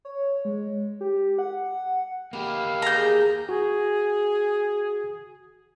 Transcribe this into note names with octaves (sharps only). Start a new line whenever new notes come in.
C#5
G#3
G4
F#5
A#3 G4 B4 F5
G#3 B3 G#4 A#5 G6
F#4 G#4